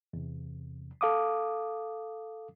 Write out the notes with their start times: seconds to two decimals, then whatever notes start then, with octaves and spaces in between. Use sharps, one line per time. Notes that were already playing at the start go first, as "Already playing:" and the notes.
0.13 E2 C3
1.01 A4 F5 D6 D#6